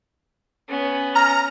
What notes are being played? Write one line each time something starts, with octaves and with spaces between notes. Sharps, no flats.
B3 C#4
A#5 F6